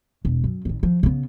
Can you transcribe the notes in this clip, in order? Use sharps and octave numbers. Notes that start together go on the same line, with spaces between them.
E1
F#2
A1 D#3
F3
C#3 B3